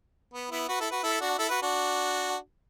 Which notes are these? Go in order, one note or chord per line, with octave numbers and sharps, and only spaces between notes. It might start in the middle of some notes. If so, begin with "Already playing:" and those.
B3
B3 E4
F#4 B4
E4 A4
F#4 B4
E4 A4
D4 F#4
E4 A4
F#4 B4
D4 F#4